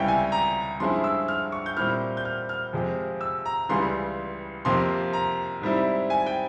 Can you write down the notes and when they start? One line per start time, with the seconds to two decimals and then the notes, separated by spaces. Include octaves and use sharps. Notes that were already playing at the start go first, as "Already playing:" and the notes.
Already playing: C#2 C3 G3 C#4 E4 G5
0.08 G#5
0.32 A#5
0.80 G2 F3 G#3 C#4 E4 C6
1.04 E6
1.28 F6
1.52 C#6
1.66 G6
1.77 A#2 G3 C4 E4 F6
2.17 G6
2.25 F6
2.49 F6
2.73 F2 C3 F3 G#3
3.21 E6
3.45 A#5
3.69 C#2 C#3 E3 G3 C6
4.65 F2 C3 F3 A#3 C6
5.13 A#5
5.61 G#2 G3 C4 E4
6.10 G#5
6.26 G5